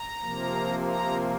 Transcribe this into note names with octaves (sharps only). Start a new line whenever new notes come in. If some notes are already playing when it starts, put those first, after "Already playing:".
Already playing: A#5
C3 F3 A#3
A#5